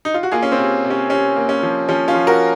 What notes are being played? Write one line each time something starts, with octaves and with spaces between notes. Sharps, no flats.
D#4
F4
F#4
A#3 F4 G#4
C#4
C4
C3
C3
C#4
C3 C#4
A#3
C#4
F3
F3 C#4
C#4 F4
F3
F#4 A#4